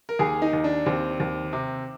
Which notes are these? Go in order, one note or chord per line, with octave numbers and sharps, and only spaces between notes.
A#4
D#2 G#4
D#4
D#2
D4
D#2 C4
D#2
C3